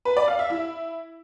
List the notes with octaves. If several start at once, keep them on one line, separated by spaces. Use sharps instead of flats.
B4
D5
F5
E5
E4